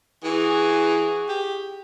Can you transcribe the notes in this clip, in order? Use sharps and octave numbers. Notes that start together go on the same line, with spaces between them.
E3 F#4 G#4
G4